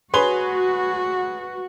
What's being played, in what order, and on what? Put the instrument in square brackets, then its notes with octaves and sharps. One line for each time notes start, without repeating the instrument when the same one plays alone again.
[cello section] F#4 [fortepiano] G#4 C#5 C6 [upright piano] B4 G7